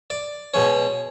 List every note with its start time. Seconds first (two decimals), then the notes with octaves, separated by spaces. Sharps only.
0.10 D5
0.54 B2 G#3 C#4 C#5